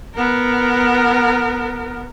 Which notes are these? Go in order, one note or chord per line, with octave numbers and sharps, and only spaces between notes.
B3 A#4